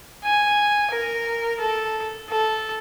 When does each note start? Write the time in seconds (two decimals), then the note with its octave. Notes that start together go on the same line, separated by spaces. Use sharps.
0.24 G#5
0.91 A#4
1.60 A4
2.29 A4